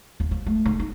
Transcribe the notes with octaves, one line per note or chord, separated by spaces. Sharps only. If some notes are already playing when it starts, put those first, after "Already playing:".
D#2
F3
A3
G#2
D#4